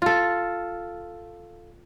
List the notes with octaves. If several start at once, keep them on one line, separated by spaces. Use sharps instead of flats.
F4 A4